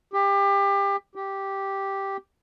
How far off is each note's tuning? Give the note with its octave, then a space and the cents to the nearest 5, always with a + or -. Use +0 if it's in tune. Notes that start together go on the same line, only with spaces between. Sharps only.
G4 +25
G4 -5